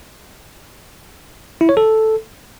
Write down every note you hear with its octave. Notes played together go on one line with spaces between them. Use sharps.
E4
C#5
A4